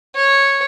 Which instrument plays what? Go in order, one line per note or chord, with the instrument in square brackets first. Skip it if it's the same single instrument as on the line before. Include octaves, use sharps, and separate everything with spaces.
[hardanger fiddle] C#5